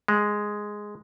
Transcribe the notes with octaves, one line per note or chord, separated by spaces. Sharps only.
G#3